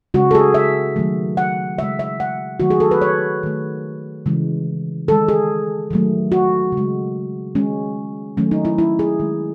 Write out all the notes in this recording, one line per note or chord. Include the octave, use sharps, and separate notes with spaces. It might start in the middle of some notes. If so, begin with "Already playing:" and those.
C#3 G#3 F#4
A4
G#4
E5
D#3 F#3 A3
F#5
C#3 G#3 E5
E5
F#5
D#3 F#3 A3 F#4
G#4
A4
B4
C#5
D#3 A3
C#3 E3 G#3
D#3 G#3 A4
G#4
D#3 F#3 A3
F#4
C#3
G#3
D#3 G#3 C#4
D#3 F#3 A3 C#4
D#4
E4
E4
G#4
D#3 G#3